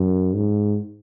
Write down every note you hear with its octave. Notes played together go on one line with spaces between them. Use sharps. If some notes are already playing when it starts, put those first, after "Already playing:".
Already playing: F#2
G#2